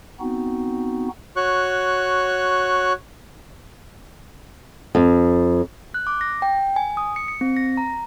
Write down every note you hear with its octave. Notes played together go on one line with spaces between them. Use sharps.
B3 C4 D#4 F#4
F#4 C#5 C#6 F#6
F2
F#6
D6
A#6
G5
G#5
D#6
C#7
C#7
C4
A#6
A#5